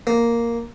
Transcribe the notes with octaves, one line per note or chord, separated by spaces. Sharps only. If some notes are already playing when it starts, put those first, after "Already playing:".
A#3